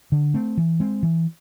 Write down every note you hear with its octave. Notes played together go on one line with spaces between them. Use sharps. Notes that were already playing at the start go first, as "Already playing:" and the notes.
D3
A3 C4
E3
G#3 C4
E3